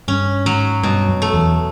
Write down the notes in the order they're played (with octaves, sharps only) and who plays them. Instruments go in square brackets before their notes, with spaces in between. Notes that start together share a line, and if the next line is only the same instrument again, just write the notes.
[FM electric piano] G2 [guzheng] C#4
[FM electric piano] G#2 [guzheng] F#3
[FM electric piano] G2 [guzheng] B2
[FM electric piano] F#2
[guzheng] A3
[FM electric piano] E2